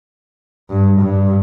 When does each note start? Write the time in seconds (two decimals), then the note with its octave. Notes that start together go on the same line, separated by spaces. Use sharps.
0.70 G2
1.00 G2